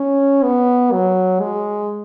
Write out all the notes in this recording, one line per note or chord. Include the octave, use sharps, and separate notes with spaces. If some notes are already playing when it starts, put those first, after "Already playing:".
Already playing: C#4
B3
F#3
G#3